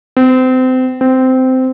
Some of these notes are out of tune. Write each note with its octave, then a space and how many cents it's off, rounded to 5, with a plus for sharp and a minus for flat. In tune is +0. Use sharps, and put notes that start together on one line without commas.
C4 -30
C4 -15